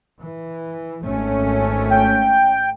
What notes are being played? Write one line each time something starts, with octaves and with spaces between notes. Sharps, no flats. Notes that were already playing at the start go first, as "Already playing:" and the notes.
E3
G#1 A3 C#4
G5